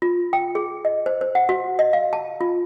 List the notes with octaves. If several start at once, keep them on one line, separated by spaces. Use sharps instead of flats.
F4
G5
G#4
D#5
C5
C5
F#5
F#4
D#5
F5
A5
F4